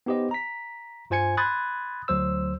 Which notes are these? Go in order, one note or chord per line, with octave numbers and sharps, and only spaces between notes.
B3 D#4 G4 C5 D#5
A#5 B6
G2 F4 C5 G#5 G#6 C#7
B5 C6 D#6 F#6 G#6 A6
D2 F#3 C5 E6